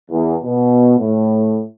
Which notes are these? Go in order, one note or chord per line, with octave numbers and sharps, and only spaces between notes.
E2
B2
A2